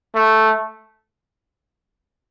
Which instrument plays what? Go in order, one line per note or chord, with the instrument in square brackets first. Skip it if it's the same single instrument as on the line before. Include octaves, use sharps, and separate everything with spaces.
[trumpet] A3